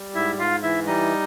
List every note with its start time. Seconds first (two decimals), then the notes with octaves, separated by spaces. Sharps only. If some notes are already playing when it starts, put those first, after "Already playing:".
Already playing: G3
0.15 G#2 E4 E5
0.39 G#2 F4 F5
0.63 E3 E4 E5
0.87 G3 D#4 D#5